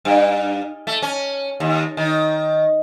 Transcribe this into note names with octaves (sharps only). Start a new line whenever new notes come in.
G2
A3
C#4
D#2
D#3